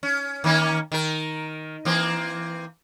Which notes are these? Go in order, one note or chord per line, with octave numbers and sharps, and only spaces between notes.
C#4
D#3 A#3 C#4
D#3 A#4
E3 A#3 C4